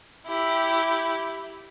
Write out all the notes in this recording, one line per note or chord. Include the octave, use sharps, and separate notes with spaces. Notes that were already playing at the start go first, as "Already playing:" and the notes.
E4 G4